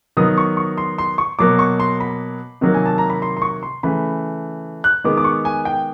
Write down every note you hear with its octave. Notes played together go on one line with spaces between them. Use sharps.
D#3 F#3 B3 D#6
C#6
C#6
C6
C6
C#6
B2 F#3 A#3 D6
C#6
C6
B5
C3 D#3 F#3 A#3
G#5
A5
A#5
B5
C6
C6
C#6
C6
C#3 E3 A3 B5
F#6
D#3 G#3 B3 D6
D6
C#6
G#5
G5